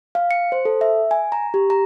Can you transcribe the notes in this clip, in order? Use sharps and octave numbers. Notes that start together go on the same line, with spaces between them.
F5
C#7
C5
A4
E5
G#5
A#5
G4
A#5